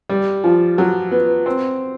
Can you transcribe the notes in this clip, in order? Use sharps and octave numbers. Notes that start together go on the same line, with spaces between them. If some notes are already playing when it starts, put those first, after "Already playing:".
G3
F3
F#3
B3
C4